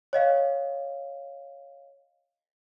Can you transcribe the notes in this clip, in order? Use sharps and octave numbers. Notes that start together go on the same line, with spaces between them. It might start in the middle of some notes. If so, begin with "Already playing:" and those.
C#5 D#5 F5